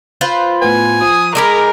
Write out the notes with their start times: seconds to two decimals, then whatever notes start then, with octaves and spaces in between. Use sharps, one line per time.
0.21 F4 B4 C5
0.62 A2 B3 G#5
1.02 F3 D#6
1.35 G#3 D#4 G#4 A#4 B5 D6 D#6